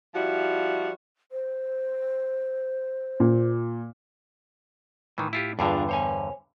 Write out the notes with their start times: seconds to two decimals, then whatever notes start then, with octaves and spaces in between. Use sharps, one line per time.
0.14 F3 G3 E4 F#4
1.32 C5
3.20 A#2
5.18 A2 D#3 E3
5.33 E4 F4 G4
5.59 E2 G2 D3 D4 F4 G#4
5.89 C5 C#5 G#5